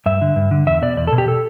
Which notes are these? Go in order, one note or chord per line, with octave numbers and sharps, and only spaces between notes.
G2 E5
D3
G2
D3
E2 E5
B2 D5
E2 D5
A4
B2
G4
A4